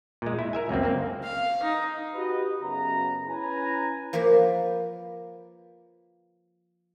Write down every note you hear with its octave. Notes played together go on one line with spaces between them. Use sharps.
A#2 G#3
E4
A#4 E5 G#5
C#2 F#2 A#3 C4
A#3 C4
F5
D#4
F#4 G4 B4 D#5
F#2 C#3 B3 A#5
C#4 E4 B4 G#5 A#5
F3 A#3 B4 C5 D5